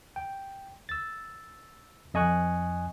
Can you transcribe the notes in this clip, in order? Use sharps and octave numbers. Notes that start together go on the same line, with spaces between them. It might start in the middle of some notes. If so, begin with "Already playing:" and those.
G5
E6 A6
F2 D#5 G#5 C#6 F#6